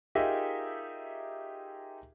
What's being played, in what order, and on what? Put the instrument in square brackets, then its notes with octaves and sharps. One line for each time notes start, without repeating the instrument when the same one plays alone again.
[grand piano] D#4 F4 G4 G#4 A#4 E5